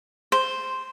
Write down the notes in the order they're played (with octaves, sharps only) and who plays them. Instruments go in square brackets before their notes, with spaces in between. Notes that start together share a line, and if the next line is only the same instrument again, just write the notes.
[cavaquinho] C5